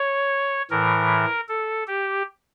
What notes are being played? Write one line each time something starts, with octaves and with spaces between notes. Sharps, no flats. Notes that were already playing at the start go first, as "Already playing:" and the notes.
Already playing: C#5
A2 E3 A#4
A4
G4